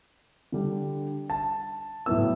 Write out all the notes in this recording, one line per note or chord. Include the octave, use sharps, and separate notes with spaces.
D3 G3 D4
A5
A2 F#3 B3 E4 E6